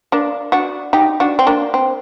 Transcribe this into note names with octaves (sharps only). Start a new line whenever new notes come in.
A#3 D4
D4 F#4
D#4 G4
D4 F#4
C4
A#3 D4
C4